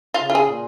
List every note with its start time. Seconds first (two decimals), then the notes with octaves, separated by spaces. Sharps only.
0.14 F4
0.21 C#3
0.30 F4
0.35 G#4
0.49 A#2